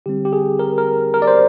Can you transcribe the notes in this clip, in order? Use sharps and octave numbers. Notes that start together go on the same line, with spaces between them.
D3 G3 C4 G4
G4
G#4
A#4
A#4
A#4
D5
C5